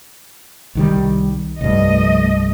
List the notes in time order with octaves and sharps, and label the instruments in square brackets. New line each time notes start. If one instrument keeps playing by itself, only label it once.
[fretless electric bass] C2 D#3 G3
[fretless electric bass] C2 G2 [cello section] F3 A3 D#5